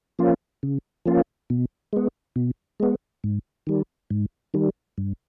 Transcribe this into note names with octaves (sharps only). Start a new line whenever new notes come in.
F3 A#3 C#4 F4
C#3
F3 A#3 C#4 F4
B2
G#3 B3
B2
G#3 B3
G#2
D#3 G3
G#2
D#3 G3
G2